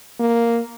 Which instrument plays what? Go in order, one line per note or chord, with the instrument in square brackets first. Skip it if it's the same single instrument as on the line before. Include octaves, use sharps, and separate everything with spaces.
[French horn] A#3